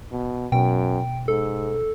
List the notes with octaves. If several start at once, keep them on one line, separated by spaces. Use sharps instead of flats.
B2
F#2 B2 G5
G#2 A4